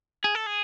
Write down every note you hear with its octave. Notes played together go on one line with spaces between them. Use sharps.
G#4
A4
G#4